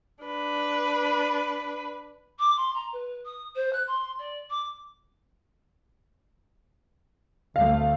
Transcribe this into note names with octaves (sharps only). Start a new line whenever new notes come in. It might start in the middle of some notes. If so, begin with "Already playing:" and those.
D4 B4
D6
C6
A#5
B4
D#6
C5
F#6
C6
D5
D6
D2 A3 F5